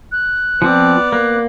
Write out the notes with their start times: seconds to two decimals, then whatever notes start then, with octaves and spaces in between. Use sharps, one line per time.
0.12 F#6
0.62 F3 B3 C4 D5
1.12 A#3 F#6